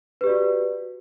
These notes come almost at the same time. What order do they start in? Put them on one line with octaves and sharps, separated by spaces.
B4 G4 D5 F#4